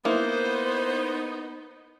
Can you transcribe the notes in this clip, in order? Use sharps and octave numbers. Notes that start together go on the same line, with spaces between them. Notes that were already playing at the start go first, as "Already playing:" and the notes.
A#3 B3 D#4 E4 C5